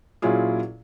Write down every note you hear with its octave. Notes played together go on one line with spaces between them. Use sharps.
A#2 F#3 C#4 E4 F4 G#4